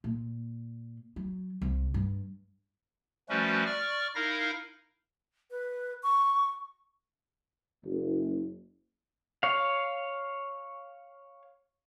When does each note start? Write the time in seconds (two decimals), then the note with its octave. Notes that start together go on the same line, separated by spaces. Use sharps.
0.04 A#2
1.16 F#3
1.62 C2
1.94 G2
3.29 F3 G3 A3 C#4 F#4 B4
3.66 D5 C#6 F6
4.15 D#4 E4 A#4 F5 A#6
5.51 B4
6.03 C#6
7.84 F#1
9.43 C#5 F5